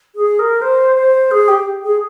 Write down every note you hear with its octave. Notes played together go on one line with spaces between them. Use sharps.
G#4
A#4
C5
C5
G#4
G4
G#4